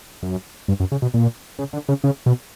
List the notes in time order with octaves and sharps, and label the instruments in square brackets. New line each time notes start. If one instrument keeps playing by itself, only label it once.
[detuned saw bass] F#2
G2
F#2
C#3
B2
A#2
C#3
D3
C#3
C#3
B2